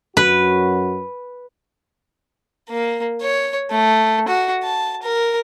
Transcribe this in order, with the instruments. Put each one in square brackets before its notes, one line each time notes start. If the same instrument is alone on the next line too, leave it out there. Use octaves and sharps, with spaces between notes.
[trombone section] F#2 F#4 [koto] B4
[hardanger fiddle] A#3
C#5
A3
F#4
A5
A#4